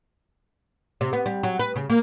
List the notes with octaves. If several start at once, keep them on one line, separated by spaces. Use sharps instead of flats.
C3
B3
G3
F#3
B4
C#3
A#3